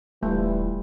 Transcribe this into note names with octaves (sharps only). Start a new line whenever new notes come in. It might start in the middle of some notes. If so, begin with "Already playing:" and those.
D1 E3 G3 A3 F4